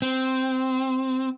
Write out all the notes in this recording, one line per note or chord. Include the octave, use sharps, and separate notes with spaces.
C4